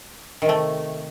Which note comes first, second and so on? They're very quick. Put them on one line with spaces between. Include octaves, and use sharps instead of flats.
D#3 C3 A3